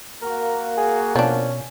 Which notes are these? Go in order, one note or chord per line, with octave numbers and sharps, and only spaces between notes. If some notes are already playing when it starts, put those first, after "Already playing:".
A#3 F#4 A#4
G#4
B2 F3 C#4 D4